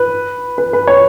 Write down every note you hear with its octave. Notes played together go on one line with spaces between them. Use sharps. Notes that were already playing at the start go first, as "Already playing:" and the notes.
Already playing: B4
B4
B4
C#5